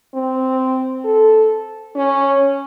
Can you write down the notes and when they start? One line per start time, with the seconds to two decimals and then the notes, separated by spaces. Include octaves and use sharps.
0.14 C4
1.04 A4
1.96 C#4